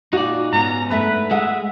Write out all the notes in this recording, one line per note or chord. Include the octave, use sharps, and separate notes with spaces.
A#2 D#4 F#4 D5
G#2 B3 C#4 A#5
G2 A3 B4 E5
G#3 G#4 E5 F#5